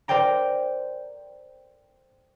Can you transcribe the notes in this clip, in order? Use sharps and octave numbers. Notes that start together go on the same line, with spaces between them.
A#4 C5 D5 G5 A#5